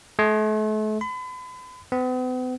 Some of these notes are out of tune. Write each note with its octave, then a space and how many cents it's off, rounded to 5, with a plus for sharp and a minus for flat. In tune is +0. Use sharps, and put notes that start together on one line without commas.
A3 -40
B5 +40
B3 +45